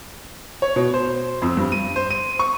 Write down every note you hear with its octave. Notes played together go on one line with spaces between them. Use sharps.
C#5
B2
C5
F2
G2
D#7
C5
D#7
C#6